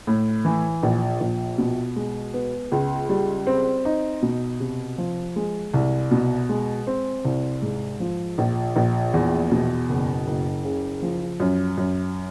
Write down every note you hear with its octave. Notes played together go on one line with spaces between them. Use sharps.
A2
E3
A#1
A#1
B2
G#3
B3
C#2
G3
C4
D#4
B2
C3
F3
G#3
C2
B2
G#3
C4
C2
G#2
F3
A#1
A#1
E2
B2
F#1
F#1
C#3
F3
F#2
F#2